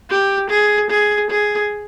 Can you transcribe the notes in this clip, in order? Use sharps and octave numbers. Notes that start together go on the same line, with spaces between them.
G4
G#4
G#4
G#4